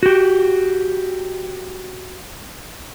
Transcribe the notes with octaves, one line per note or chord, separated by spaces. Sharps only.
F#4 G4